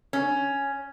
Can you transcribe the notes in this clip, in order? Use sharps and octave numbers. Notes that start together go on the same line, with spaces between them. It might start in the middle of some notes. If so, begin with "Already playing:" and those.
C#4